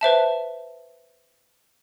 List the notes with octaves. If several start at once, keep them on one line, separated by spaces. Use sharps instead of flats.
B4 C5 E5 A5